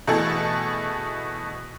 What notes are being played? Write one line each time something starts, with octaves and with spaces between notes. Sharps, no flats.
B2 E3 A3 G#4 A4